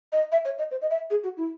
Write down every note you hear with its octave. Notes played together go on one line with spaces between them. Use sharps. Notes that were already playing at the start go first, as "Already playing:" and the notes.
D#5
E5
C#5
D#5
C5
D#5
E5
G#4
F#4
E4